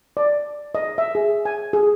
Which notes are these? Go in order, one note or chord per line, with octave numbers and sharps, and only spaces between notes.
D5
D#5
E5
G#4
G#5
G#4